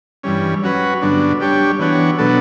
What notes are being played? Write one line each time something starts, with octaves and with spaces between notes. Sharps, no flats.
G2 E3 G3 C#4
F#3 C#4 F#4 B4
G2 D3 F#3 B3 D4
G3 D4 G4 C#5
E3 B3 D4 F#4 C#5
B2 F#3 B3 D4 A4